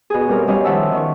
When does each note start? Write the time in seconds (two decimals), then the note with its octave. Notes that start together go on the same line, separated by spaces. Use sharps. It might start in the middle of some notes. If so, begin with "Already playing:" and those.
0.10 B2 G#4
0.28 F#2 G3 C4 A#4 F6
0.47 B2 G3 C#4 D#5 F5
0.64 D#3 F3 E5 F#5 A5 E6
0.92 D#3 C#6